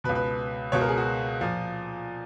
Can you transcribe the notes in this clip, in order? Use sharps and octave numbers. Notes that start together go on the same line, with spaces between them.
B2 B4
C#2
B4
C#2 B2 C#5
A#4
G#4
F#4
A#2 F3